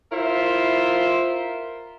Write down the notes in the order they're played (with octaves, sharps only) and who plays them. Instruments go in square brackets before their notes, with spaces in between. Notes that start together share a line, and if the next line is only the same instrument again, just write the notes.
[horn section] E4 F4 A#4 C5 E5